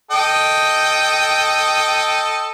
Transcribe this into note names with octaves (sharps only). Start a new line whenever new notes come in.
A4 D#5 G5